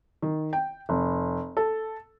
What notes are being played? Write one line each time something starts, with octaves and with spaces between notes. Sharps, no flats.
D#3
G5
F1
A4